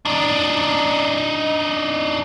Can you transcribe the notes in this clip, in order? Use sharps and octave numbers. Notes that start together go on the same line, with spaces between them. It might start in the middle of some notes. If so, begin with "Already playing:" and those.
D4 D#4